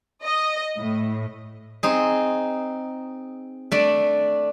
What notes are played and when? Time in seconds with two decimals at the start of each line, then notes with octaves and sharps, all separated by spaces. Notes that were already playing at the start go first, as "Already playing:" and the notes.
0.24 D#5
0.78 A2
1.83 C4 D#4 G#4
3.72 A3 D4 D5